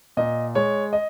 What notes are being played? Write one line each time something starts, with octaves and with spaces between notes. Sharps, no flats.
A#2 D#5
G#3 C#5
D#5